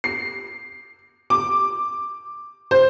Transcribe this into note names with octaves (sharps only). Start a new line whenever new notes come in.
C7
D6
C5